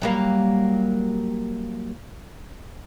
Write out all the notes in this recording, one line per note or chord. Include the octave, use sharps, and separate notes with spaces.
F#3 G3 A#3